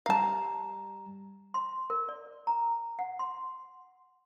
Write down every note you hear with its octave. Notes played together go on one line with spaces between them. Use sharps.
G3 F5 A5 A#5
C6
A#4
D5
A#5
F#5
C6